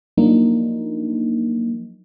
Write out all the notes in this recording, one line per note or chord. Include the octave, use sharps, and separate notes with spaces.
F3 F#3 A#3 D4 D#4